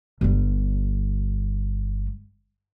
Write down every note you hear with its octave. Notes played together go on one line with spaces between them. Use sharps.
G1 G3